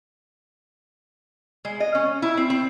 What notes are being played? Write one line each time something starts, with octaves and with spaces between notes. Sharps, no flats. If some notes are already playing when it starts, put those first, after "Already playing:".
G#3
D#5
C#4
E4
C4
C4